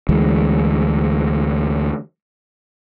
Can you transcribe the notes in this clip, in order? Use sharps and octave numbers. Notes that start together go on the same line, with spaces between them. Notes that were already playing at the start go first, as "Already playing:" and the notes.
D2 E3 G#3